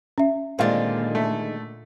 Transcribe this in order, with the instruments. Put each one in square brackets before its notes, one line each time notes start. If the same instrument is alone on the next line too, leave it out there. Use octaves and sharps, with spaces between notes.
[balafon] C#4 E5
[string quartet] A#2 D3 [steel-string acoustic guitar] D#3 G#3 [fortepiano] C4 F4 D5
[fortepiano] A3